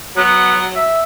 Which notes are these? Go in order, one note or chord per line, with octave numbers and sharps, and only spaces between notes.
F#3 B3
E5